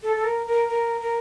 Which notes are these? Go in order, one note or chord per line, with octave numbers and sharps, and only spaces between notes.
A4
A4
A#4
A#4
A#4
A#4